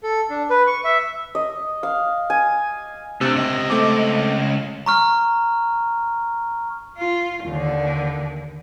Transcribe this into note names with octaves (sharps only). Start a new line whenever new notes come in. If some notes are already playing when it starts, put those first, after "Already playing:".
A4
D4
B4
C#6
E5
D#5
F5
G#5
C3 A3 D4
C#2 D#5
A3 C4 D6
A#5 C#6 F6
F4
D#2 D3